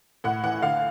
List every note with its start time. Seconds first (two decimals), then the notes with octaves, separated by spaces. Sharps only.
0.24 A2 F#5
0.43 E3 F#5
0.62 D3 F5